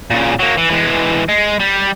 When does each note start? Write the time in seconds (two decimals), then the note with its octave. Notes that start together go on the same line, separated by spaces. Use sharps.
0.11 A#2 C#3
0.40 F#3 A#3
0.57 E3
0.71 E3 G#3
1.29 G#3
1.60 G3